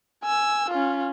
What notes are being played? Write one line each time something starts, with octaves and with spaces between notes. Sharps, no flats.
G#5 E6
C#4 F4